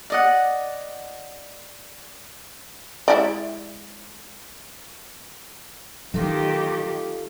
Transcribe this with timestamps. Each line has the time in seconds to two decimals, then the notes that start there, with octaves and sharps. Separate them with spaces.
0.10 D5 D#5 F#5
3.08 G#3 E4 D5
6.14 D#3 F#3 A3 F4 G4